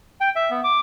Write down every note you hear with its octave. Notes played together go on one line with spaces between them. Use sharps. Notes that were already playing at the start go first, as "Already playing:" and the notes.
G5
E5
B3
D6